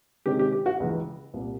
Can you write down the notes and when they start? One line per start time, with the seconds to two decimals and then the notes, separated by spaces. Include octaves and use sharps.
0.26 C3 D#3 G#3 C#4 G4
0.39 G4
0.52 G4
0.66 F#4
0.80 C#2 C#3 E3
1.34 C2 A#2 G3 A#3